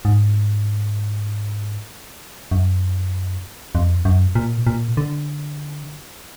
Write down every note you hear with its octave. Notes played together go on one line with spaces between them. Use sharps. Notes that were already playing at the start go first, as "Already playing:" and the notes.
G#2
F#2
F2
F#2
A#2
A#2
D3